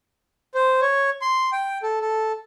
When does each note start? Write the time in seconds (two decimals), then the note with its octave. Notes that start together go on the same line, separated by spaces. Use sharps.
0.55 C5
0.81 C#5
1.22 C6
1.52 G5
1.83 A4
2.00 A4